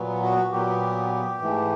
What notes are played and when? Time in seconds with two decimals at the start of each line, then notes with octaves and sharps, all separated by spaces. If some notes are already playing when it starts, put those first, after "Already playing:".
Already playing: A#2 F#3 B3
0.23 F#4
0.51 A#2 F#3 B3 G4
1.39 G#2 E3 A3